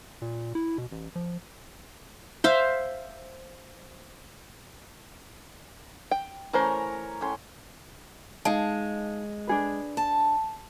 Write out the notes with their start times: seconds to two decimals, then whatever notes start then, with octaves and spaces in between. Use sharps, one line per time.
0.22 A#2
0.55 E4
0.78 B2
0.91 A1
1.15 F3
2.44 C5 E5 F5
6.11 G5
6.53 E3 A3 C#4 A#4 C5 A#5
7.21 A2 C#4 C6
8.45 G#3 D#4 F5 A5
9.47 D4 G#4 B4
9.97 A5